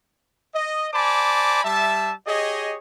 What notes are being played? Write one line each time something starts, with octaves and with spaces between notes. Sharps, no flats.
D#5
C5 D5 G#5 A5 B5 D6
G3 E5 A5
G4 G#4 C#5 D#5